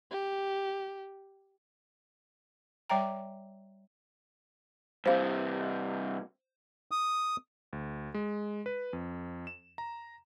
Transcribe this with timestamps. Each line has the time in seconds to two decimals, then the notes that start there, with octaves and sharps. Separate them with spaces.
0.11 G4
2.90 G3 C#5 E5 G5 A#5
5.06 G2 C3 C5 F5
6.91 D#6
7.73 D2
8.14 G#3
8.66 B4
8.93 F2
9.47 E7
9.78 A#5